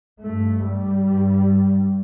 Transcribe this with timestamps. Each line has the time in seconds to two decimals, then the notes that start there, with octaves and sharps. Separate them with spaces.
0.21 G2 A3
0.64 G3
1.06 G2